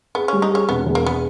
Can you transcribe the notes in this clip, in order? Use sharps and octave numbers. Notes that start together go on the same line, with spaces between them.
B3 G#4
C#4
G3
D#4
C#4 G#4
E1 B3
E2
A#3
E1 B3